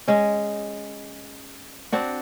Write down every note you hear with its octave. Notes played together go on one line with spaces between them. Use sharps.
G#3 C#4
C4 D4 F#4